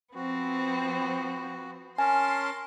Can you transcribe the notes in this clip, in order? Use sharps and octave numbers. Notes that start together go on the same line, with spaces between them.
F3 B3 C4 F#4
C#4 A#4 G#5 A5 C6